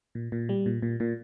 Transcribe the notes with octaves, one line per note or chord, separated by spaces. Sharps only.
A#2
A#2
G3
A#2
A#2
A#2